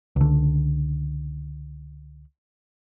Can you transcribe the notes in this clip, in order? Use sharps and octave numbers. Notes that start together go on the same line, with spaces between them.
C#2 D3